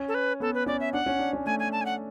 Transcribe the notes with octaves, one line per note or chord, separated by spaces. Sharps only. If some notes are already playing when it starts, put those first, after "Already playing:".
Already playing: C#4
A4
B4
B3 A4
B4
C#4 D5
E5
D4 F#5
C#4
D4
C#4
A3 G#5
G#5
A5
G#5
F#5